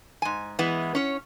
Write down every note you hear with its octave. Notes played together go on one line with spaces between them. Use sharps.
G#2 G#5
E3 G#3 B3
C#4 C#5